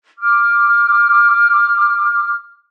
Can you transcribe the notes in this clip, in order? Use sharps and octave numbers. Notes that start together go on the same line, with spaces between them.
D6 F6